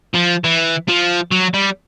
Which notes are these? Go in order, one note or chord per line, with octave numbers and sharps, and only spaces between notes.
F3
E3
F3
F#3
G3